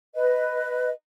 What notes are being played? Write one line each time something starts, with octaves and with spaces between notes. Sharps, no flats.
B4 D#5